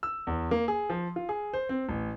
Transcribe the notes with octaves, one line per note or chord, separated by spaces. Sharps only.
E6
E2
A#3
G#4
F3
F4
G#4
C5
C4
A1